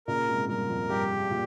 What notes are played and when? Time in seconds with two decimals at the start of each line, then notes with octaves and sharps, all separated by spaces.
0.07 A#2 C#3 A#4
0.29 G#2 C3
0.48 G2 A#2 A#4
0.69 F2
0.89 G2 G4
1.31 A#2